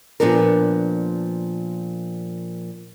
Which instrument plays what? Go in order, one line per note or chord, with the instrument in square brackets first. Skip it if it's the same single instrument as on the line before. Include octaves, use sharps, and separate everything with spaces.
[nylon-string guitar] A#2 F3 B3 D4 A#4